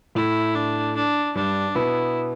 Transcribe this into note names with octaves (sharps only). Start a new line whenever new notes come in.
A2 A3 E4
D4
D4
G2 G3 D4
B2 B3 E4